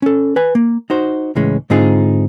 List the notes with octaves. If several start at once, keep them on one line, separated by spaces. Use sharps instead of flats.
C#4 A4
B4 G#5
A#3
D#4 F#4 C5
C#2 A2 E3 G#3 C#4
G#2 D3 C4 D#4 F4 G#4